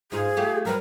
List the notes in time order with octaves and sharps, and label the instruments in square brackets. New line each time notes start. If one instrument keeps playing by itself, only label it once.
[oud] G#2 D#4 F4 [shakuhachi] G#4
[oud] A3 F4 G4
[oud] F#3 G3 B4 [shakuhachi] A#4